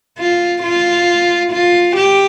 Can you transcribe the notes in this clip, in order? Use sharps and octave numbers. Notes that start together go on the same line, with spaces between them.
F4
F4
F4
G4